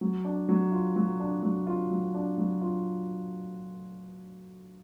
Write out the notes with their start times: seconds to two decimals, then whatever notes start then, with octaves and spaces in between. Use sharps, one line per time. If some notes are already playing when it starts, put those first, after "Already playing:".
0.01 F#3
0.25 D4
0.49 F#3
0.72 F4
0.96 F#3
1.20 D4
1.43 F#3
1.67 F4
1.91 F#3
2.14 D4
2.38 F#3
2.61 F4